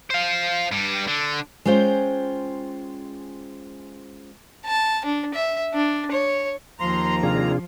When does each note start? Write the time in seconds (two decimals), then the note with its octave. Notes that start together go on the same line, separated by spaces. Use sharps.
0.10 C5 F5
0.72 G2 G3
1.08 D3
1.65 G#3 C#4 F4 C5 G5
4.66 A5
5.05 D4
5.34 E5
5.74 D4
6.12 C#5
6.79 D#2 F3 A#5 C6
7.23 C3 D4 F4 G#4